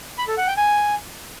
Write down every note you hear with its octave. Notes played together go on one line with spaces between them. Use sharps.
B5
A4
F#5
G5
G#5